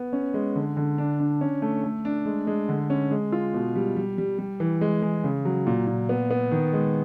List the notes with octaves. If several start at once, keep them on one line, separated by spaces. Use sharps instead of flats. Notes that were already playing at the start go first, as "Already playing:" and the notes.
Already playing: B3
C#4
G#3
D3
D3
D4
D4
C#4
A3
A3
D4
G#3
G#3
D3
C#4
G#3
F4
B2
G3
G3
G3
G3
E3
G#3
G#3
C#3
F#3
A#2
A#2
B3
B3
D#3
G#3